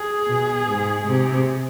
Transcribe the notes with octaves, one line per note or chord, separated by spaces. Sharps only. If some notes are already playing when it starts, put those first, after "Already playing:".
Already playing: G#4
B2
G#2
C3